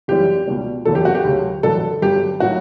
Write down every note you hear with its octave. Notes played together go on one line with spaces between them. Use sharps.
F#1 F#2 E3 G3 G4
C#2 B2 G3
F#1 E2 D3 F#3 A4
G4
F#4
G4
D2 C#3 F#3
A1 G2 D3 F#3 A4
G1 G2 F#3 G4
A2 F#3 F#4